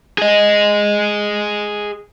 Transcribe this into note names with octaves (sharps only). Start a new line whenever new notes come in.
G#4 D#5